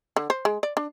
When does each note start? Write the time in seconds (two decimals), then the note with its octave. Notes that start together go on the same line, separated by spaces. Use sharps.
0.16 D3
0.30 C5
0.45 G#3
0.63 D5
0.77 D4